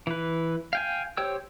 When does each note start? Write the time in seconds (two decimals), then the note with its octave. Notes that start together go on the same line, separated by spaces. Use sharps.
0.07 E3 B4
0.73 F5 G5 G#5
1.17 G4 C5 C#5 G5 E6